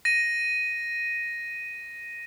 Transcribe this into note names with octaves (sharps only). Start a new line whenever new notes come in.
A#6 D#7